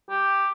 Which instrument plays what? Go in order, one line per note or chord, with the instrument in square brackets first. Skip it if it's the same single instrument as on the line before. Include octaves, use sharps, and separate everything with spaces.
[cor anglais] G4